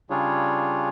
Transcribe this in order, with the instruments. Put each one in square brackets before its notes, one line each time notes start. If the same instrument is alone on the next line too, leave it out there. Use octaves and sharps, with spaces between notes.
[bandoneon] C#3 G3 D4 F4 G#4 C#5